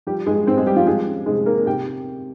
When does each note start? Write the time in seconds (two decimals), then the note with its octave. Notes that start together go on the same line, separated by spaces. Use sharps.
0.07 F3 G3 G4
0.26 G2 G#3 G#4
0.47 G2 C4 C5
0.57 G#3 G#4
0.66 G3 C4 G4
0.76 F3 F4
0.87 F3 G#3 G#4
1.07 C#4
1.26 C3 G#3 G#4
1.46 A#3 A#4
1.66 C3 G4 G5